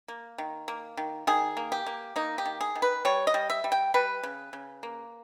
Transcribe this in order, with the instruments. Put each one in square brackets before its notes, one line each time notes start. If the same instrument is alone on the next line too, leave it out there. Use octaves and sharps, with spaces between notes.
[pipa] A#3
D#3
A#3
D#3
D#3 G#4
A#3
G4
A#3
A#3 D#4
G4
D#3
G#4
D#3
B4
G3 C#5
D#5
G3
E5
G3
G5
G3 B4
C#3
C#3
A#3